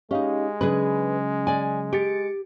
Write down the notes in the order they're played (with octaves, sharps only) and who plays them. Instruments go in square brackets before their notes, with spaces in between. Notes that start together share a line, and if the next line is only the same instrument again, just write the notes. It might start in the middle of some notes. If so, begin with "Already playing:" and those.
[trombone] G#3 [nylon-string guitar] C#4 D#4 [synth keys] G4 D#5 F5
[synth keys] C#3 F#3 C#4 [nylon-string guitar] D4 G#4 B4
[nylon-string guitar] D5 G#5
[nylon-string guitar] G4 [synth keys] A6 C#7 D7